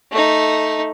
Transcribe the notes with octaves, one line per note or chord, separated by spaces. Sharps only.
A3 D#4